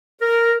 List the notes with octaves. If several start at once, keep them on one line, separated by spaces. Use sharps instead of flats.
A#4